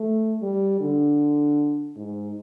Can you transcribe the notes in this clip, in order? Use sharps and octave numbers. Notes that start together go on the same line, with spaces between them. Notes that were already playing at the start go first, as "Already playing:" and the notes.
Already playing: A3
G3
D3
G#2